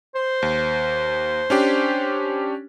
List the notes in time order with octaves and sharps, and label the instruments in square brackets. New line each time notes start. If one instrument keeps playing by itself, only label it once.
[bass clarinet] C5
[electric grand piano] D#2
C#4 D4 G4